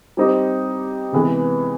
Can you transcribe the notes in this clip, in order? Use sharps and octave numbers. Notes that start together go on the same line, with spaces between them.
G3 C4 D#4 G4
C3 E3 G#3 B3